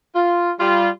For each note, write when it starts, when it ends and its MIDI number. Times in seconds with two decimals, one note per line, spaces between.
0.14 0.51 65
0.59 0.89 55
0.59 0.89 65